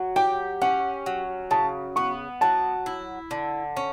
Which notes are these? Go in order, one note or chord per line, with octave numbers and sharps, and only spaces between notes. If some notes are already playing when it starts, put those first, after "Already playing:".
Already playing: F#3
G4 G5
C#4 F#5
F#3
C#3 A5
B3 C#6
F#3 A5
E4
D3
C#4